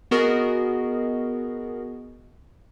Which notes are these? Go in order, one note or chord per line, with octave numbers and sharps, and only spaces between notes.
B3 F#4 G#4 A#4 D#5